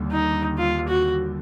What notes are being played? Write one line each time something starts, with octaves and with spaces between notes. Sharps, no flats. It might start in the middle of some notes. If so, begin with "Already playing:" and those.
Already playing: D#2 D3 G3
D#4
F4
F#4